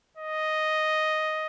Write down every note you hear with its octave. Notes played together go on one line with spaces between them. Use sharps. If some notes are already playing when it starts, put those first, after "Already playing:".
D#5